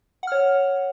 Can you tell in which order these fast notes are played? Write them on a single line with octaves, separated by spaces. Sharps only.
F#5 F6 C#5